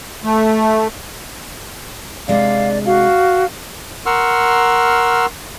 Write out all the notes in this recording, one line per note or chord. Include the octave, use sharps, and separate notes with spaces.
A3
C3 G#3 D4 D5 F5
F#4 F5
A#4 F#5 C6 C#6 E6 F6